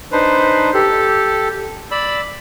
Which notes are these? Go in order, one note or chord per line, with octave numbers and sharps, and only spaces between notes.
D4 D#4 B4 C5
G4 A4
D5 B5 E6